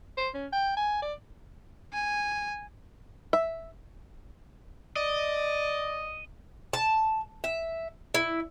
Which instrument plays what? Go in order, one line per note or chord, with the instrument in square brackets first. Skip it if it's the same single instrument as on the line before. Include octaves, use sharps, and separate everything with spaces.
[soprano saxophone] C5
C#4
G5
G#5
D5
[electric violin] G#5
[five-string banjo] E5
[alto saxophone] D5 [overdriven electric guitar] D#5
[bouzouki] A5
E5
E4